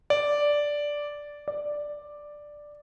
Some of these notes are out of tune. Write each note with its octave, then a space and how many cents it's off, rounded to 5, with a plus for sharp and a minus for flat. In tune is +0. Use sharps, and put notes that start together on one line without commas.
D5 -5
D5 +5